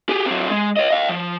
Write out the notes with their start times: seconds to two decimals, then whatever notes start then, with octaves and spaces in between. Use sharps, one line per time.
0.09 G4 G#4
0.26 F#3 C4
0.50 G#3
0.77 C#5 D#5
0.91 D#5 F5
1.09 F3